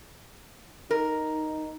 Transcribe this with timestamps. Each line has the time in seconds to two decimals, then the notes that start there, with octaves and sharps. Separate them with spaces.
0.91 D#4 A#4